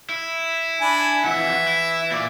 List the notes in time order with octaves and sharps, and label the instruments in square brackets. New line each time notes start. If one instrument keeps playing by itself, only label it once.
[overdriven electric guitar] E4
[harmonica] D4 G#5 B5
[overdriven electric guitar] F2 F#5 [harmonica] E3 E5
[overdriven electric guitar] E4
A#2 D5